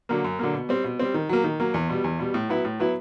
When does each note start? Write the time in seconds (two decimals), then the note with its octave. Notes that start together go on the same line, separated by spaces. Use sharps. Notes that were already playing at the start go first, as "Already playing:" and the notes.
0.09 D3 F#3 A#3
0.24 F#2
0.39 D3 F#3 A#3
0.54 B2
0.69 G3 C4
0.84 B2
0.99 G3 C4
1.14 D#3
1.29 F#3 A#3
1.44 D#3
1.60 F#3 A#3
1.74 E2
1.89 B2 G3
2.04 E2
2.19 B2 G3
2.34 A2
2.49 F#3 B3 E4
2.65 A2
2.80 F#3 B3 E4